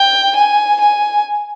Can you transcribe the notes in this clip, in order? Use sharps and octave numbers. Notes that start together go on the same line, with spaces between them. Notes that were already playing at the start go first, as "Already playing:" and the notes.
Already playing: G5
G#5
G#5